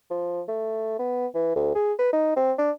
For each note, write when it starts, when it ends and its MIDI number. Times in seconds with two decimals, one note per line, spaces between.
0.11 0.41 53
0.48 0.99 57
0.99 1.27 59
1.35 1.53 52
1.55 1.72 38
1.75 1.93 68
1.99 2.10 71
2.13 2.35 63
2.36 2.52 60
2.58 2.71 62